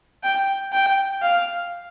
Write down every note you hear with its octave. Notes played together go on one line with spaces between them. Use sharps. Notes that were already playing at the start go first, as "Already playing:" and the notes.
G5
G5
F5